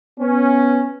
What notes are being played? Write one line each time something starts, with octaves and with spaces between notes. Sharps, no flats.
B3 C#4